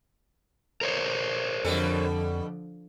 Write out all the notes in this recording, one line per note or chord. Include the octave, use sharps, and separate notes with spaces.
A#4 C5 C#5
F2 B2 D3 F3 G3 A4